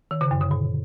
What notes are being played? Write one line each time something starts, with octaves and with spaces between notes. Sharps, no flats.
D#3
C#3
F#2
D3
A#2